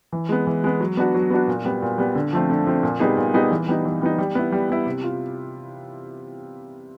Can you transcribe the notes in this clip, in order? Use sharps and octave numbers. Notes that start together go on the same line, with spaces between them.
E3
G#3 B3
E3
G#3 B3
F#3
B3 D4 F#4
F#3
B3 D4 F#4
A#2
G3 B3
A#2
G3 B3
D3
F3 A3 C4
D3
F3 A3 C4
A#2
G3 B3 D#4 G#4
A#2
G3 B3 D#4 G#4
E3
G3 B3 D#4
E3
G3 B3 D#4
G3
B3 E4
G3
B3 E4
C3
F4